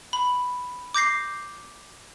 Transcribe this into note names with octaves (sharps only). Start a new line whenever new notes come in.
B5
D6 G6 A#6 C7